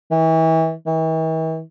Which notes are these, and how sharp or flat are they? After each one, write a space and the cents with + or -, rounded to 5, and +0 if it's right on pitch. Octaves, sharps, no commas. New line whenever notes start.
E3 -35
E3 -45